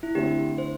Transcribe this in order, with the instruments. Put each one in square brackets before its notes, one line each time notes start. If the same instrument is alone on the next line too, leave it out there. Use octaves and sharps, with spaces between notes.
[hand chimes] E4
[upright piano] D3 A3 C4 E4 [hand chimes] G4
[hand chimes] C5